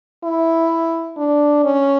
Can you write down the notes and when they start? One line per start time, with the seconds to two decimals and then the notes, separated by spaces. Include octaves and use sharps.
0.24 E4
1.17 D4
1.64 C#4